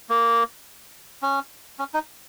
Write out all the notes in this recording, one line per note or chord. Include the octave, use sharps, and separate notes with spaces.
A#3
C#4
C#4
D#4